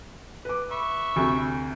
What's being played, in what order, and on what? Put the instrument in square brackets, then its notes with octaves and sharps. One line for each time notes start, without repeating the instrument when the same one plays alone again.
[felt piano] B4 D6
[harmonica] E5 B5 C#6
[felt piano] D2 C3